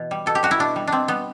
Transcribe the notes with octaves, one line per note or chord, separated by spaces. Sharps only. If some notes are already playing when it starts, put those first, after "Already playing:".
Already playing: B2 E3
G3
B2 A4
G4
G3 F#4
E4
B2 D4
G3
B2 C4 D4
G3 B3